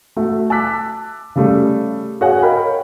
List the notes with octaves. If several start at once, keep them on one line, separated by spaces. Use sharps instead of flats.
A3 F#4 E5
A5 D6 E6 F#6 B6
C#3 G3 A3
F#4 G#4 C#5 F5 F#5 G#5
A#4 C#5 D#5 F5 G5 B5